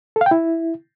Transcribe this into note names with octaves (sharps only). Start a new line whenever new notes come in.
A4
F5
G5
E4